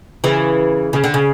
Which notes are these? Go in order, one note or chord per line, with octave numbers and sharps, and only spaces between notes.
C#3 E3
C#3
D3
C#3